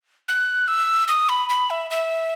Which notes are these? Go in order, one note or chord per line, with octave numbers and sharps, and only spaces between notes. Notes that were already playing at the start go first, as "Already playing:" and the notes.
F#6
E6
D#6
B5
B5
E5
E5